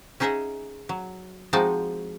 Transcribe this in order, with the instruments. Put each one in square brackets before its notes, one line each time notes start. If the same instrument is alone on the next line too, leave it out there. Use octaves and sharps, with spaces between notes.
[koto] C#4 D#4 G#4 D#5 E5 F#5
F#3
F3 G#3 C4 D#4 F#4 A5